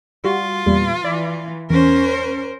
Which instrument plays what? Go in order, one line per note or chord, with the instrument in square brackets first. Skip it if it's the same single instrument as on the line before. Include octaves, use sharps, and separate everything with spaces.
[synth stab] G3 F#4 [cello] F4
[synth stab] E2 A#2 G3 [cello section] E3
[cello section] E3 [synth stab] D5
[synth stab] E2 [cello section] C#4 [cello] A#4 C5